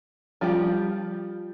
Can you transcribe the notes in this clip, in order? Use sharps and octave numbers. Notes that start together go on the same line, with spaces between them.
F3 G3 F4 G4